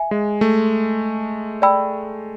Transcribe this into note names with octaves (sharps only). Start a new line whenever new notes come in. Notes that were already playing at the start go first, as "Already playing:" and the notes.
Already playing: E5 G#5
G#3
A3
D5 G5 B5 E6